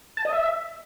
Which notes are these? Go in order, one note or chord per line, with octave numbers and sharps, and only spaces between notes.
A5
D#5
E5